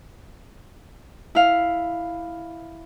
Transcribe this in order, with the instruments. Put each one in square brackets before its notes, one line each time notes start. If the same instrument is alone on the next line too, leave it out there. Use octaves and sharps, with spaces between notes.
[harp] E4 F5